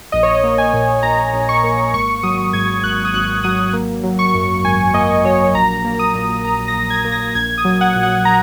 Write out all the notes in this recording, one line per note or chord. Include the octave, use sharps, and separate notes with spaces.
A#1 D#5
C#5
D#5
A#3
G#5
A#2
A#1 A#5
A#1
C#6
A#3
G#1 C#6
F#3 D#6
G#2 G#6
G#1 F#6
D#6
G#1 F#6
F#3 D#6
A#3
F#3
C#6
F#2
G#1 G#5
A#3 D#5
F#3 C#5
A#1 A#5
A#3
D#6
A#2
A#1 A#5
A#6
A#1
G#6
A#3
A#6
A#1 G#6
D#6
F#3
F#5
A#2
F#5
A#5